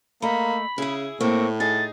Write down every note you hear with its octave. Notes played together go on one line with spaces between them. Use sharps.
A3 A#3 D#4 B5
C#3 E4 G#4
A2 A#3 C4 C#6
D#4 G#4 A6